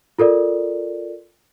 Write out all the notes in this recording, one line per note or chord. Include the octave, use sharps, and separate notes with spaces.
F4 A4 A#4 D5